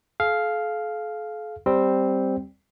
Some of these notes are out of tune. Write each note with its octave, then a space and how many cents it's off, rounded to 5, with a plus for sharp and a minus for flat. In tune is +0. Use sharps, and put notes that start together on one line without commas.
A4 -45 F5 +0
G3 +0 C4 +0